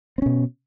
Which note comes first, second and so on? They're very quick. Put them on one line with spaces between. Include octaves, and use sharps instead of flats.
C4 C#4 B2